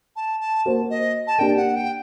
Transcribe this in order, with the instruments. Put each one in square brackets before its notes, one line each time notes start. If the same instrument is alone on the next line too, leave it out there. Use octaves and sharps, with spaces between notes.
[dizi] A5
A5
[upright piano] A#3 F#4 C5
[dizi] D#5
A5
[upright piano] A#3 D4 G4 [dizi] G5
[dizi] F#5
G5